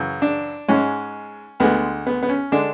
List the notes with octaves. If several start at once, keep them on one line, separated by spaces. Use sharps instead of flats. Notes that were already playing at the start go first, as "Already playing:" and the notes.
Already playing: F#2 C#3 E3
D4
G#2 G#3 C#4
D2 D3 G#3 B3
B3
B3
C#4
D3 G#3 D4